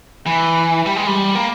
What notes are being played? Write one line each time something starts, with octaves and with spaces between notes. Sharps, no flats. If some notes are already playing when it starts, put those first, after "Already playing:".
E3
G3
G#3
G3
A#3